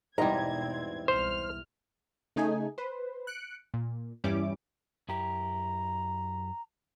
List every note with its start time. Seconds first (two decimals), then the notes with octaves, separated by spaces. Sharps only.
0.18 E2 G#2 B2 G3 C4 D#5 A#5 G#6
1.08 C2 C5 F6
2.36 C#3 A3 D#4 G#4 G#5
2.78 B4 C5
3.27 F#6 C#7 D7
3.74 A#2
4.24 E2 G2 G3 C#4 E4 D6
5.09 F#2 E4 G4 A#5